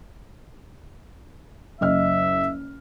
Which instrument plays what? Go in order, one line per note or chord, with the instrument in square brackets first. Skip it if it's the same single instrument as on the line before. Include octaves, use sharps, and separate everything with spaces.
[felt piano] F#1 D#5 F6 [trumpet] E5